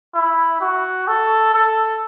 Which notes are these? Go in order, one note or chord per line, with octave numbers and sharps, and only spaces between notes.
E4
F#4
A4
A4